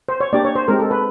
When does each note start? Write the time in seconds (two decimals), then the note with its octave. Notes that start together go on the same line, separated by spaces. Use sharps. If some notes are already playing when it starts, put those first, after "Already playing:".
0.09 C5
0.20 C#5
0.33 A#3 D4 G4 D5
0.45 C#5
0.55 C5
0.68 G#3 C4 D#4 G4 A#4
0.79 A4
0.91 B4